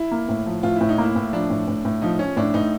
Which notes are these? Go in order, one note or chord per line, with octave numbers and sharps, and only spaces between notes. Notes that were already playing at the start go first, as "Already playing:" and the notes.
Already playing: E4
A#3
A2
F3
A2 F4
A2 E4
D#4
A#3 E4
A2
F3 D4
A2
A2
A2
F3 D#4
F3 C#4
A2 D4
A2 D#4